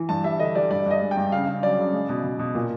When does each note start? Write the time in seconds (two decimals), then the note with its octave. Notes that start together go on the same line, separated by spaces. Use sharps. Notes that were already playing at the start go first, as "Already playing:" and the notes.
Already playing: E3
0.09 G2 A5
0.24 G3 E5
0.40 D3 D#5
0.55 G3 D5
0.71 G2 D5
0.86 G2 D#5
1.01 G#3
1.11 G5
1.17 G2
1.32 C#3 F5
1.47 C#3
1.63 F#3 D5
1.79 C#3
1.93 G#3
2.09 B2
2.24 B2
2.39 B2
2.55 A#2